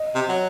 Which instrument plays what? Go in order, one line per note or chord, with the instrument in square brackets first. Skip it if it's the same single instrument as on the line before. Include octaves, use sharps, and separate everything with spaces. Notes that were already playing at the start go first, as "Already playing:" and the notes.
Already playing: [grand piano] D#5
[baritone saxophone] C3
F#3